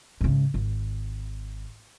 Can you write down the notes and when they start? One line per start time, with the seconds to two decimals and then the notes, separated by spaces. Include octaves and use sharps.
0.21 G#2 C#3
0.54 G#1